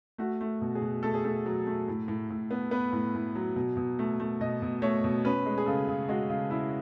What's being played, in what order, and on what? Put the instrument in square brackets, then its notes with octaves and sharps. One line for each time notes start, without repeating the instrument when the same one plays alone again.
[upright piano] A3 F#4
A3
B2
G#4
B2
A3 A4
G#4
A3 A4
F#3
A3
A2
A2
A2
B3
B3 B4
A2
A2
F#3
B2
B2
A3
A3
B2 D#5
B2
A3 C#5
B2
C#4 B4
G#3
G#4
C#3 A4
C#3
G#3 F#4
C#3
C#3 E4